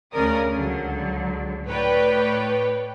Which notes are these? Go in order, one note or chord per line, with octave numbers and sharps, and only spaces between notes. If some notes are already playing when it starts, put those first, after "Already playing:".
D2 C#3 C#4 A#4 D5 D#6
C#2 D3 F#3
A2 B4 C#5 D5 G5